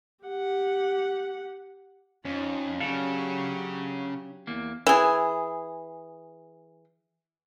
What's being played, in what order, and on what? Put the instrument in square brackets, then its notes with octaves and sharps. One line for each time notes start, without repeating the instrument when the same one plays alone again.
[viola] G4 F#5
[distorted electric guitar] F2 [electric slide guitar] C#4 [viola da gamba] D#4 F4
[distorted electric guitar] C#3 [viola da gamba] F#3 G4 [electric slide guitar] C#4 D4 F5 [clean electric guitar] A4
[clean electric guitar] E2 A#3
[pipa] E3 G#4